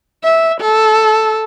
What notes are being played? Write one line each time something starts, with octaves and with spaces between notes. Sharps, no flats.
E5
A4